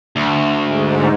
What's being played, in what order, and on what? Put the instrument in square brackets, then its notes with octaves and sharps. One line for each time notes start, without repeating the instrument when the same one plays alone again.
[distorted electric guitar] D2
[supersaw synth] G#2